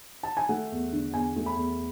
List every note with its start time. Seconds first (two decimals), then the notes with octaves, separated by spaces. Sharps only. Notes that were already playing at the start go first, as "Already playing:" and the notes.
0.23 A5
0.37 G#5
0.49 A3 F#5
0.72 E2
0.93 D3
1.14 E2 G#5
1.36 A3
1.46 B5
1.57 E2